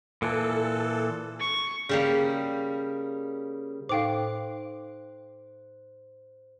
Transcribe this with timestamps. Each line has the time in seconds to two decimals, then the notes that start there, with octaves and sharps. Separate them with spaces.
0.22 A#2 E3 A4
1.40 C#6
1.89 C#3 G3 A#3
3.89 A2 D#4 A4 C5 F5 G5 D6